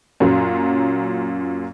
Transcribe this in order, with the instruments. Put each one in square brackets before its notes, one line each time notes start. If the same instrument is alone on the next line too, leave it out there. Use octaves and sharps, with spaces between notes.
[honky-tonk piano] F#2 A#2 F#3